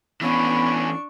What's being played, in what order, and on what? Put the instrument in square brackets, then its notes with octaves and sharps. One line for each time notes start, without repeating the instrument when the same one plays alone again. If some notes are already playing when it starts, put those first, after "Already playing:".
[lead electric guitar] E3 C#4 [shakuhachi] B3 [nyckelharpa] D4 C#6 [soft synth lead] B5